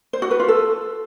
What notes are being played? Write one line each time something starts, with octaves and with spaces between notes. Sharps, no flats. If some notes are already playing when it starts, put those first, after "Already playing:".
C5
F#4
B4
F4
A4